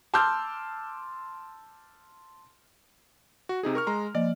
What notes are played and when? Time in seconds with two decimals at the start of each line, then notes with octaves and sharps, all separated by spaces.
0.14 A5 C6 D6 E6 F6 G6
3.49 F#4
3.63 C3 D#4 G#4
3.75 A#4 C#6 F6
3.87 G#3 A#5 C6
4.15 F3 A#3 D5 D#5